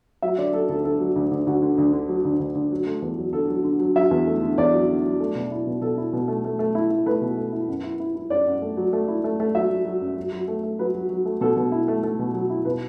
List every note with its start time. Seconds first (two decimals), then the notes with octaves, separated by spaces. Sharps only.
0.22 F#3 E5
0.38 D3 D5
0.54 F#3 A4
0.69 D2 A4
0.85 D3 A4
1.00 F#3
1.16 D2
1.31 D2
1.47 D2 F#4
1.62 D3
1.78 D2
1.93 D3
2.08 F#3
2.25 D2
2.39 D2
2.55 D2
2.71 F#3
2.87 A3
3.02 E2
3.17 F#3
3.33 D3 A4
3.48 F#3
3.64 D3
3.79 F#3
3.95 F#3 E5
4.11 E2
4.27 A3
4.42 D3
4.58 E2 D5
4.73 F#3
4.88 D3
5.04 F#3
5.20 A3
5.35 B2
5.51 E4
5.67 B2
5.81 B2 A4
5.97 E4
6.13 B2
6.28 A3
6.45 A3
6.59 A3
6.75 E4
6.90 E4
7.06 A3 B4
7.21 B2
7.37 A3
7.53 E4
7.68 F#2
7.84 E4
8.00 E4
8.15 E4
8.30 F#2 D5
8.46 F#2
8.62 A3
8.77 F#3
8.93 A3
9.08 E4
9.24 A3
9.40 A3
9.55 F#3 E5
9.70 F#3
9.85 F#3
10.02 F#2
10.17 F#3
10.32 F#3
10.48 A3
10.63 A3
10.79 F#3 B4
10.95 F#3
11.10 F#3
11.26 A3
11.41 B2 A4
11.57 B2
11.72 E4
11.88 A3
12.03 A3
12.19 B2
12.34 F#3
12.50 E4
12.65 B2 B4